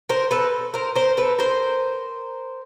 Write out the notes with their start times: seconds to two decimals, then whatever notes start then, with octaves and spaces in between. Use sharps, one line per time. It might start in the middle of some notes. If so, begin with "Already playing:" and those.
0.09 A#4 C5
0.31 A4 B4
0.74 A#4 C5
0.96 A#4 C5
1.17 A4 B4
1.39 A#4 C5